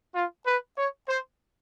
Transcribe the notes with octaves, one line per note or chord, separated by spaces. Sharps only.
F4
B4
C#5
C5